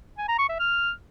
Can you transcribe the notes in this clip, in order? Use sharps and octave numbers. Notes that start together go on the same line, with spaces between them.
G#5
A#5
C#6
E5
F6